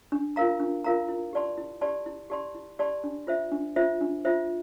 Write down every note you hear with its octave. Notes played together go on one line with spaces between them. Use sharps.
D4
F4 A#4 F5 A#5
D4
F4 A#4 F5 A#5
E4
G4 D5 A5 C6
E4
G4 D5 A5 C6
E4
G4 D5 A5 C6
E4
G4 D5 A5 C6
D4
F4 C5 E5
D4
F4 C5 E5
D4
F4 C5 E5